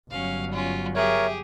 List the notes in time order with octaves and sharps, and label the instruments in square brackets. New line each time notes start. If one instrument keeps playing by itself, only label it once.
[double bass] G1 F#3 [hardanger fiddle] C#4 F5
[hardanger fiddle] C#4 F4
[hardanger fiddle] G4 G#4 [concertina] A#4 C#5 [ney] E5